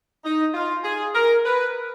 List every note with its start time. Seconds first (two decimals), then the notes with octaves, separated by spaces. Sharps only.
0.23 D#4
0.54 F4
0.83 G#4
1.13 A#4
1.44 B4